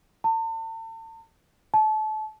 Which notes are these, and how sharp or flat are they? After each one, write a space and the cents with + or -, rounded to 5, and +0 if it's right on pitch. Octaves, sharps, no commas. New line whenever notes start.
A5 +40
A5 -30